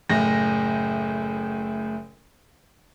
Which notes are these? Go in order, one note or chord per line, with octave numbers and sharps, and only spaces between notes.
F#1 A2 A#6